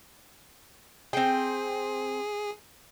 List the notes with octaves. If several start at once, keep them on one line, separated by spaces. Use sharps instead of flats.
C4 G#4 G5